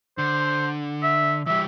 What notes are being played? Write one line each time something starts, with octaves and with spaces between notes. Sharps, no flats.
D3 C5
E5
E3 G3 E5